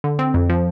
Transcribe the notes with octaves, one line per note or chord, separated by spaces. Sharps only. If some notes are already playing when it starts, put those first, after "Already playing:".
D3
C4
F2
F3